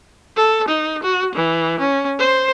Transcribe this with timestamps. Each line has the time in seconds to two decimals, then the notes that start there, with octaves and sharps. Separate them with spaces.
0.36 A4
0.68 D#4
1.03 F#4
1.35 E3
1.79 C#4
2.19 C5